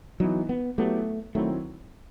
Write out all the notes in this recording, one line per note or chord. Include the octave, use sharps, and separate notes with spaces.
E3 F#3 B3 D#4
B3
F#3 A3 B3 E4 G4
D#3 F#3 A3 C4 E4